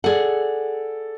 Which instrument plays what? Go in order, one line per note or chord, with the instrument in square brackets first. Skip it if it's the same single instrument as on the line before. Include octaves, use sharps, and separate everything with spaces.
[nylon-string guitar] G#4 F#5 [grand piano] A4 D5